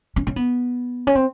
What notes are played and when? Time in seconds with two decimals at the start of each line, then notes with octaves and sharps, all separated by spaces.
0.16 C#4
0.27 C#4
0.36 B3
1.07 C#4
1.15 C4